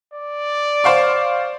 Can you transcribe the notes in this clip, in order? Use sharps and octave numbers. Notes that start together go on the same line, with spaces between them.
D5
C5 F5 C#6